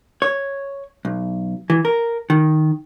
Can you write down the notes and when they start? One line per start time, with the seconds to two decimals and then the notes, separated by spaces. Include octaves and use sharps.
0.22 C#5
1.05 B1
1.70 E3
1.85 A#4
2.30 D#3